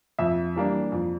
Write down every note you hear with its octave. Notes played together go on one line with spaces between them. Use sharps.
F2 E5
E3 G3 A#3 D4
F2